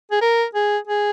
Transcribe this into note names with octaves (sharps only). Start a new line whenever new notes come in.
G#4
A#4
G#4
G#4